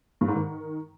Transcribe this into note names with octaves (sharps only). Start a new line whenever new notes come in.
G2
G#2
D#3